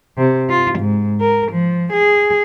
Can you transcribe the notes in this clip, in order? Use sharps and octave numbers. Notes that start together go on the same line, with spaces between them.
C3
F4
G#2
A#4
F3
G#4